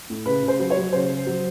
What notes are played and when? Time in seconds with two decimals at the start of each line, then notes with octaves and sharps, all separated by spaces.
0.10 A2
0.26 C#3 B4
0.43 C#3
0.48 C5
0.59 F#3
0.70 C#5
0.77 F#3
0.93 C#3 C5
1.09 C#3
1.27 F#3